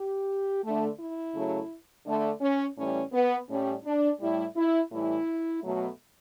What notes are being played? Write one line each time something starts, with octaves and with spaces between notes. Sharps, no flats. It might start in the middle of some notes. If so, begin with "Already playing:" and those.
Already playing: G4
A3
D3
E4
C#3 F#3 A3
D3 A3
C#4
A2 E3 G3 C#4
B3
A2 G3 C#4
D4
A2 G3 E4
E4
A2 E3 G3 E4
B2 F#3 A3